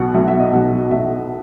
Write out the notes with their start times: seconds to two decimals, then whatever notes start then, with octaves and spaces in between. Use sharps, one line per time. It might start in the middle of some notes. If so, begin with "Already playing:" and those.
Already playing: B1 B2 F#3 F#5
0.14 B1 B2 F#3 E5
0.28 E5
0.39 D#5
0.53 B1 B2 F#3 F#5
0.91 B1 B2 F#3 E5